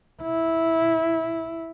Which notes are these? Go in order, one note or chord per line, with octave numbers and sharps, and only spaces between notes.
E4